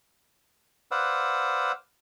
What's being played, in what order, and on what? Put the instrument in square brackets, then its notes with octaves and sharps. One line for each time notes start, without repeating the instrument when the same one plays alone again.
[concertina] B4 C5 D5 F5 F#5 E6